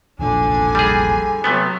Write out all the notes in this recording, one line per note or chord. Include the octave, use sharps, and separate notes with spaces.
E1 A#1 D3 F3 D4 G#5
G3 G#4
C3 F#3 A3 B3